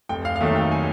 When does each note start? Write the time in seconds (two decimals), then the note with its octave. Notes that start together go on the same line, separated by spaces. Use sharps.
0.09 F1 G5
0.25 F5
0.36 F5
0.40 D#2 D#3 F#3 A3 E5
0.56 G5
0.71 G#5